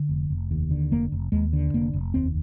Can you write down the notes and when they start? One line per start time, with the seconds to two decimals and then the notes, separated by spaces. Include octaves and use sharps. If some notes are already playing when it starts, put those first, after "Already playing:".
Already playing: D3
0.09 F1
0.30 F1
0.51 D#2
0.71 D3
0.91 F1 A#3
1.12 F1
1.32 D#2 G#3
1.53 D3
1.74 F1 A#3
1.93 F1
2.14 D#2 C4